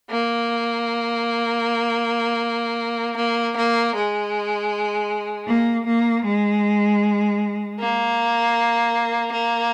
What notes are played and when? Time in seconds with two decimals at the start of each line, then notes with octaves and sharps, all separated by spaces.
0.11 A#3
3.17 A#3
3.56 A#3
3.94 G#3
5.48 A#3
5.86 A#3
6.25 G#3
7.79 A#3
9.32 A#3